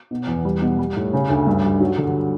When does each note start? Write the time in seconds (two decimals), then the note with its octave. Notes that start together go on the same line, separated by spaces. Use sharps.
0.11 B2
0.27 E2
0.45 G3
0.62 B2
0.79 G3
0.96 A2
1.13 C#3
1.30 D2
1.47 G2
1.63 G3
1.80 F#3
1.98 D3